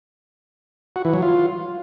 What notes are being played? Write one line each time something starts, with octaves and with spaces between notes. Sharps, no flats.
F#4
E3
F#3
F4